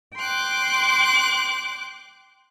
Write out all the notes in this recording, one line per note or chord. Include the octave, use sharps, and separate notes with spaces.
G5 C6 D6 F#6